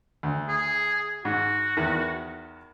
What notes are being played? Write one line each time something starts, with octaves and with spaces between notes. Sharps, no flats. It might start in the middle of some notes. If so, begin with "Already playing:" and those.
D2
G#4
G#2 F#4
E2 D#3